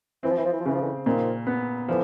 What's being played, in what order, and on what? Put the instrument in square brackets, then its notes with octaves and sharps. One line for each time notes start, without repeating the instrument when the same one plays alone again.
[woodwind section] E3 [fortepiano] C4
[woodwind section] F3
E3
F3
E3
F3
[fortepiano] C#3 [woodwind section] E3
[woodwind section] F3
D3 E3
[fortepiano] A#2 [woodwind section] D#3 F3
[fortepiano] B3
[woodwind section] D3 E3 [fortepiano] F3